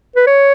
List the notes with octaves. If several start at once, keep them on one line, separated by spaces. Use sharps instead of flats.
B4
C#5